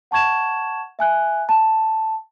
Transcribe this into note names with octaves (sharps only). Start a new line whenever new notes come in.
F#5 A5 C#6 G#6 E7
E5 G#5 F#6
A5